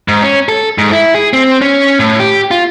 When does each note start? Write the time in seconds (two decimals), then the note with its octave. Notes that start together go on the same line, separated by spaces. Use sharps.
0.08 G#2
0.23 C#4
0.49 A4
0.78 G#2
0.92 E4
1.14 G#4
1.33 C4
1.61 C#4
1.99 A2
2.19 G4
2.51 F4